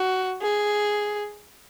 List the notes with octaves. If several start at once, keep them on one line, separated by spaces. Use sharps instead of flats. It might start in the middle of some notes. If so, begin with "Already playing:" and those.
Already playing: F#4
G#4